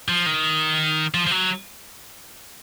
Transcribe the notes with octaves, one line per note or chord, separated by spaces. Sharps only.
F3
D#3
F3
F3
F#3